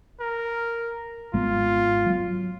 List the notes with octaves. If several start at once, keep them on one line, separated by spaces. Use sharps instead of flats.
A#4
G#1 G#3 B3 F4
F#3